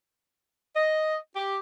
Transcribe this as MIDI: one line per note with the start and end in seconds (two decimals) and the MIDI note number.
0.76 1.16 75
1.36 1.57 67